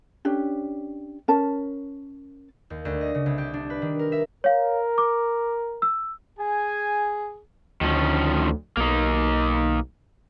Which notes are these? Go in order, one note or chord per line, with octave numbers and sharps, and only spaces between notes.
C#4 D4 G4
C#4 A#4 A5
D#2
D2
D#5
C#3
C2
G4
D4
B4
D#3
A#4
E5
A#4 C#5 F5
D6
E6
G#4 G#5
D2 D#3 F3 C#4
B1 A#3 D#4